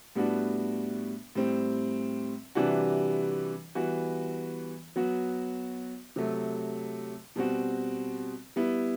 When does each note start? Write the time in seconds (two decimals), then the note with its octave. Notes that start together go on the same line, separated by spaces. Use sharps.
0.15 A2 G3 B3 D4 F#4
1.35 A2 G3 C4
2.55 C3 E3 G3 D4 F#4
3.75 E3 G3 B3 F#4
4.96 F#3 B3 F#4
6.16 C3 F#3 A3
7.36 B2 G3 C4 F#4
8.56 G3 B3 E4